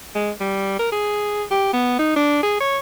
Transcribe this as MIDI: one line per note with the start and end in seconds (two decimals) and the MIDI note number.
0.15 0.31 56
0.40 0.78 55
0.79 0.89 70
0.92 1.43 68
1.51 1.69 67
1.73 1.94 59
1.99 2.14 63
2.16 2.42 62
2.43 2.56 68
2.60 2.79 73